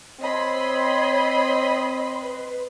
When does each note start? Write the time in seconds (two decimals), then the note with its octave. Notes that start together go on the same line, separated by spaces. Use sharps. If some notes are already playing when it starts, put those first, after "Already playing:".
0.20 C4 C#5 D#5 B5 C6
2.22 B4